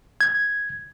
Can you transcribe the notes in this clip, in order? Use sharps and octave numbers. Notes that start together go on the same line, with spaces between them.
G#6